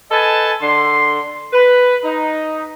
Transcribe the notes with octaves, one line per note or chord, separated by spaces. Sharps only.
A4 B4 D#5 G#5 A5
D3 C6
B4
D#4